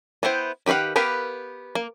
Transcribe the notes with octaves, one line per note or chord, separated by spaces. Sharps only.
B3 E4 C5 G5
D#3 G4 B4 F5 F#5
B3 G4 A#4 B4 F5
A#3